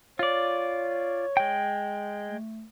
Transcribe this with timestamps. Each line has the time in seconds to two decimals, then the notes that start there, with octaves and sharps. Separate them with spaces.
0.19 F4 C#5 D5
1.37 G#3 G5
2.25 A3